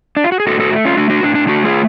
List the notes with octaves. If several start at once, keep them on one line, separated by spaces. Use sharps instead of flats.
D4
F4
F#4
G#4
A2 F#4 A4
F#4 A4
A3
C#4 F4
A3 D4 F#4
D4 F#4
A2 D4
D4
A3 D4 F#4
F4 G#4